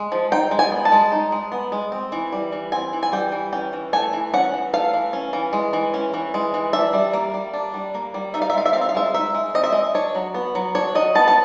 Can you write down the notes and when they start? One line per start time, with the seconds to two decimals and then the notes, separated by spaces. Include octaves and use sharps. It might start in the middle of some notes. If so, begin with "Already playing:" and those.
Already playing: G#3
0.12 F3
0.32 D#4 G5
0.51 G#3
0.59 G#5
0.72 B3
0.85 A5
0.92 G#3
1.12 D#4
1.32 G#3
1.52 B3
1.72 G#3
1.92 C4
2.12 E3
2.32 G3
2.52 E3
2.72 C4 G#5
2.93 E3
3.03 G#5
3.12 G3 G5
3.32 E3
3.53 C#4 G5
3.73 E3
3.93 A3 G#5
4.13 E3
4.33 C#4 F#5
4.54 E3
4.73 A3 F5
4.94 E3
5.13 C#4
5.33 E3
5.53 G#3
5.73 E3
5.94 C#4
6.14 E3
6.34 G#3
6.54 E3
6.73 D4 E5
6.93 G3
7.13 A#3
7.34 G3
7.53 D4
7.74 G3
7.95 A#3
8.14 G3
8.34 D#4 E5
8.42 F5
8.50 E5
8.54 G#3 F5
8.66 E5
8.73 C4 F5
8.81 E5
8.89 F5
8.94 G#3 E5
9.14 D#4 E5
9.34 G#3
9.54 C4 D#5
9.64 E5
9.72 G#3 D#5
9.94 D4 C#5
10.15 F#3
10.34 B3
10.55 F#3
10.75 D4 C#5
10.95 F#3 D#5
11.15 B3 A5
11.28 A5